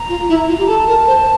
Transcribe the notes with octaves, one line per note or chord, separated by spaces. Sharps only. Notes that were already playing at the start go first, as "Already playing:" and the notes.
Already playing: A#5
F4
E4
F4
G4
A4 A5
A#4
C5